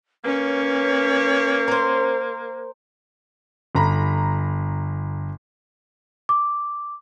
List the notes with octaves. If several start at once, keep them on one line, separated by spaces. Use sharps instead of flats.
A#3 C#4 B4 C#5
A#4 C5
G1 A#5 B5
D6